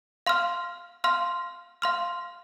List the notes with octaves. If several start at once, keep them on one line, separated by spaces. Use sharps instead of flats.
F5 C6 F6
F5 C6 F6
F5 C6 F6